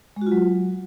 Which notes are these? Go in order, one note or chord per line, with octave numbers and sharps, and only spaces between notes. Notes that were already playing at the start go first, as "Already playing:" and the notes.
G#3
F#4
F4
F#3